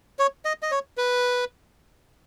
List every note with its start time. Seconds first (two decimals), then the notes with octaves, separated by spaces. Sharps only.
0.19 C#5
0.45 D#5
0.62 D#5
0.71 C#5
0.97 B4